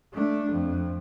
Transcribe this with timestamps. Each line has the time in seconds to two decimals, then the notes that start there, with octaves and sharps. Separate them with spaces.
0.14 A3 D4
0.51 F2